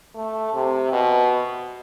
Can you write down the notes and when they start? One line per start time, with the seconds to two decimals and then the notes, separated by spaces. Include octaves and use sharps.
0.15 A3
0.53 C3
0.92 B2